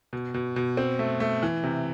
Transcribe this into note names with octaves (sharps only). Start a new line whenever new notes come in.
B2
B2
B2
C4
A3
A3
E3
C3